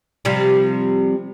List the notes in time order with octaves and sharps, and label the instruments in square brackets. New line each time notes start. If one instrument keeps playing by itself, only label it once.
[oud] C3 F3 G3